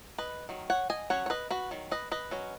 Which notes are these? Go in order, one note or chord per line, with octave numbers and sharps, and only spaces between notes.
B4 D#5
D#3 F#3
C#5 F#5
D#5 G#5
F#3 C#4 C#5 F#5
C#5
B4 D#5
F#4 B4
D#3 F#3
B4 D#5
B4 D#5
F#3 C#4